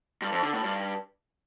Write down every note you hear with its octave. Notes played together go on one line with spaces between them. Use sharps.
G2
F2
D3
A2
G2